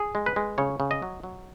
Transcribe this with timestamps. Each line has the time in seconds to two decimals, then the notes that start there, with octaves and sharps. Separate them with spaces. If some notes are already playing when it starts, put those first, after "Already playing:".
Already playing: G#4
0.15 G#3
0.26 B4
0.36 G#3
0.58 C#3 C#5
0.80 C#3
0.91 D#5
1.02 F#3
1.23 F#3